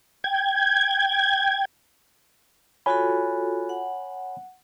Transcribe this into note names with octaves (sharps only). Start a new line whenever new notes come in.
G5 G#6
F4 F#4 A4 C#5 G#5 B5
F#5